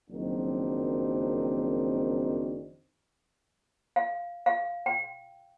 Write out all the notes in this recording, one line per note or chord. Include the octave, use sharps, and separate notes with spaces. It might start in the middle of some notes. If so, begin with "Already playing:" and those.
F#1 F2 D#3 F#3 C4 D4
F5
F5
G5